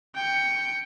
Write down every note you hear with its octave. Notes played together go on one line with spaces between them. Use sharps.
G5 C#7